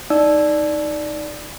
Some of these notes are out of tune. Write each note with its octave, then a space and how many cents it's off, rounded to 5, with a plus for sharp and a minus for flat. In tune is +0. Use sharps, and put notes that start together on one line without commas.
D#4 +0 D5 +0 E6 +0